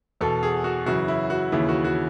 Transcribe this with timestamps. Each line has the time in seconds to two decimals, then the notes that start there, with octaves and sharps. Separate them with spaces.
0.21 E2 B2 A4
0.43 G#4
0.64 F#4
0.86 F#2 C#3 E3 F#4
1.08 E4
1.30 F#4
1.52 D#2 C#3 E3 E4
1.69 F#4
1.84 F#4